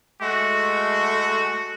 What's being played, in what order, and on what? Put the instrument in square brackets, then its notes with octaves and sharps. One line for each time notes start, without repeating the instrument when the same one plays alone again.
[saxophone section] G#3 A3 [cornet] F#4